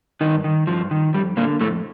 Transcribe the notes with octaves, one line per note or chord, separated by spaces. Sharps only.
G2 D#3 D#4
D#3
G2 F3
D#3
F2 G3
A#2 D3 A#3
F2 A2 A3